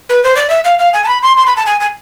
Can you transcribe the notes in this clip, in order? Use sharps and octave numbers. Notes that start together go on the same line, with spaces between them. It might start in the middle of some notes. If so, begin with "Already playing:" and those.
B4
C5
D5
E5
F5
F5
G#5
A5
B5
C6
C6
B5
A5
G#5
G#5